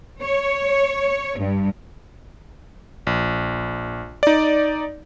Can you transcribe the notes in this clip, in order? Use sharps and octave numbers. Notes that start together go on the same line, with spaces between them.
C#5
G2
A#1
D#4 D5